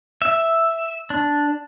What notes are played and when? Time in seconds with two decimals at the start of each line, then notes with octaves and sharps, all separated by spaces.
0.22 E5
1.10 D4